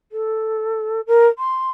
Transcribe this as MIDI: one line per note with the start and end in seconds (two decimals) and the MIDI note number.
0.12 1.00 69
1.07 1.27 70
1.38 1.70 84